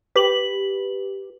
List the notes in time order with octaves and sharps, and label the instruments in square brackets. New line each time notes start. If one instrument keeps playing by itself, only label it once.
[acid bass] G4 [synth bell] B4 F#7